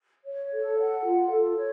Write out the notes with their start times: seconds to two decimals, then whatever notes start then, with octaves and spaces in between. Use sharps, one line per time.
0.24 C#5
0.51 A4
0.78 F#5
1.04 F4
1.30 A4
1.56 C#5